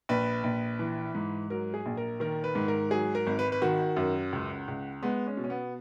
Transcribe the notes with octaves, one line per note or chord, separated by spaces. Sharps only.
A#1 B4
A#1
E3
G#2
F#3 A#4
G#4
A#1
A#4
D#3 A#4
B4
G#2
A#4
F#3 G#4
A#4
G#1
B4
B4
D#3 F#4
F#2
C#2
C#2
G#3 B3
C#4
B2
C#4
B3